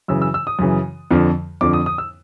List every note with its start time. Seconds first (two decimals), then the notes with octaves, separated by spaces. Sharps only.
0.08 F#2 C#3 E3 E6
0.22 E6
0.34 E6
0.47 D#6
0.59 F#2 C#3 E3
1.11 F2 D3 F3
1.61 F2 D3 F3 D6
1.73 D#6
1.86 D#6
1.98 E6